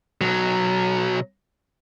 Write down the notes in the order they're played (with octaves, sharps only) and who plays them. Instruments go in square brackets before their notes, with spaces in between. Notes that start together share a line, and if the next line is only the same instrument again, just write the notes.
[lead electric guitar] B1 F#3